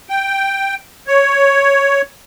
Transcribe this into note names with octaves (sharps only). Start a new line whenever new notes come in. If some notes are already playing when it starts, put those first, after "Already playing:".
G5
C#5